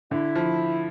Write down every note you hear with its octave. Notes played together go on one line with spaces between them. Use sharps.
D3 E4
F3